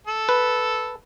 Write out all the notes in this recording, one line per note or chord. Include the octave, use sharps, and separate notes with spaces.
A4
B4